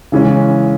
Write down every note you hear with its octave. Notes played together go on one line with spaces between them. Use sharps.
C#3 E3 G#3 C#4